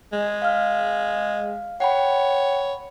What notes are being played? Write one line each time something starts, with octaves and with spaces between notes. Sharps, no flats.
G#3
F5 F6
C#5 F#5 G5 B5